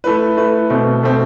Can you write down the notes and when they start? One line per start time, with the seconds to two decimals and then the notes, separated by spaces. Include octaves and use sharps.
0.04 A3 E4 B4
0.37 A3 E4 B4
0.70 B2 A3 C4
1.03 B2 A3 C4